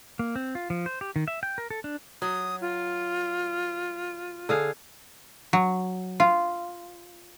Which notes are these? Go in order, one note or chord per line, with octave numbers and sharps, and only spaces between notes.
A#3
C4
F4
F3
C5
G4
D#3
E5
G5
A#4
A4
D4
F#3 D#6
F4
D3 G#4 F5
F#3
F4